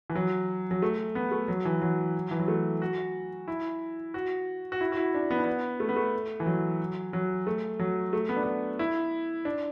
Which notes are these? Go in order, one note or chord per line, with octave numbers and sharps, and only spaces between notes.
E3
F#3
F#3
A3
B3
A3
F#3
E3
F#3
E3
F#3
A3
F#4
E4
F#4
F#4
E4
F#4
E4
D4
B3
D4
B3
A3
B3
A3
E3
F#3
F#3
A3
F#3
A3
B3
D4
B3
E4
D4